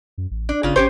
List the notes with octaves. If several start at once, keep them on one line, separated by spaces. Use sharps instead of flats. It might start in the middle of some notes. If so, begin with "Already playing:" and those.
F#2
A1
D4
G1 C#3 F4
G#1 C#4 G4 C5 C#5